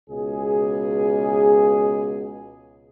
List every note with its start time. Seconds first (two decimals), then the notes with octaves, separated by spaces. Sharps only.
0.10 C#2 B2 G#4